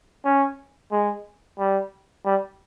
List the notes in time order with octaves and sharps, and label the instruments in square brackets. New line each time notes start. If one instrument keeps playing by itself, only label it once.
[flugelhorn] C#4
G#3
G3
G3